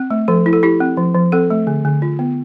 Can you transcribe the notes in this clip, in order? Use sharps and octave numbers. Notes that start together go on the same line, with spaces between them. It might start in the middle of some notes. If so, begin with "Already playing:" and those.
Already playing: C4
A3
F3 A4
E4
A4
E4 G4
C4
F3
F3
C4 A4
A3
D3
D3
F4
B3